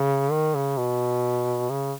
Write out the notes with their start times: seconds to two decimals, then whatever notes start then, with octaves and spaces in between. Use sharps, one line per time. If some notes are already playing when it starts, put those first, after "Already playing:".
Already playing: C#3
0.31 D#3
0.55 C#3
0.77 B2
1.70 C#3